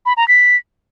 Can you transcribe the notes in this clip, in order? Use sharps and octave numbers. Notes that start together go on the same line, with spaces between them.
B5
A#5
B6